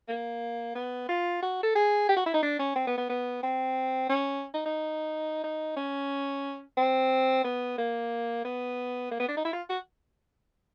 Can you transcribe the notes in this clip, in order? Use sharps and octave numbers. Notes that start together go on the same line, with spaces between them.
A#3
B3
F4
F#4
A4
G#4
G4
F#4
E4
D#4
D4
C#4
C4
B3
B3
B3
C4
C#4
D#4
D#4
D#4
C#4
C4
B3
A#3
B3
A#3
B3
D4
D#4
E4
F4
F#4